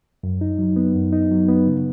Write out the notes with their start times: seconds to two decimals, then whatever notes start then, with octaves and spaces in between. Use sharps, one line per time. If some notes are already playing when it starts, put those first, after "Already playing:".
0.23 F#2
0.41 D#4
0.59 F#3
0.76 B3
0.95 F#2
1.13 D#4
1.31 F#3
1.49 B3
1.67 C#3